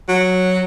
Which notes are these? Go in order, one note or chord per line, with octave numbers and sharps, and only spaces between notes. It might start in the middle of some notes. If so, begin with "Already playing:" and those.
F#3